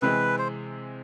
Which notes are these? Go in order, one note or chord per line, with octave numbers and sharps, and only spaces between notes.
C3 E3 G#3 C4 B4
C5